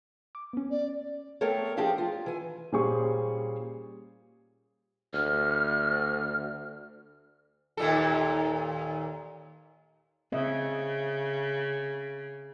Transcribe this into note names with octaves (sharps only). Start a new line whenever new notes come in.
D6
B3 C#4
D5
A3 B3 C4 A4 A#4 C#5
F3 C4 D4 G4 G#4 F5
F4
E3 G#5
A#2 G3 C#4 G#4 C5 C#6
D2 F6
D#2 A#2 A4
C#3 C4 D#5 E5